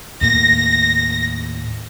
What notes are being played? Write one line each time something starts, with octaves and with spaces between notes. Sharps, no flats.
D#2 A2 A#3 A#6